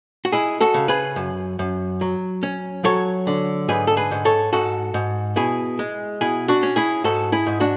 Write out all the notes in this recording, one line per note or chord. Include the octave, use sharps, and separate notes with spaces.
F#4
G#3 E4 G#4
F#4 A4
C#3
G#4 B4
F#2
F#2
F#3
C#4
F#3 A4 C#5
D3
G#2 G#4 B4
A4
G#4 B4
G#2
A4 C#5
G#2 F#4 A4
G#2
B2 E4 G#4
G#3
B2 E4 G#4
D4 F#4
C#4
E4 G#4
G#2 F#4 A4
E4 G#4
G#2
D4 F#4